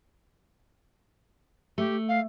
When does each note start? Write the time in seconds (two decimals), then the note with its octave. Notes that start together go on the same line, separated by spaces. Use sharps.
1.78 A3 G4
2.09 F5